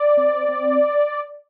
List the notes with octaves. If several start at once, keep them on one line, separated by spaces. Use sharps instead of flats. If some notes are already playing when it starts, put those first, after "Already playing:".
Already playing: D5
C4
C4